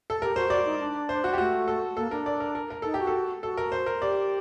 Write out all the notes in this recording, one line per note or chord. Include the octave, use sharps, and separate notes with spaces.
A4
G4 A#4
F#4 C5
G4
F#4 D5
D#4
D4
C5
F#4
G4
A3 F#4
A4
A#3 A4
D4 A#4
D5
A#4
A#4
A#4
D#4 A4
G4
F#4
A4
F#4 A4
A#4
C5
A#4
G4 D5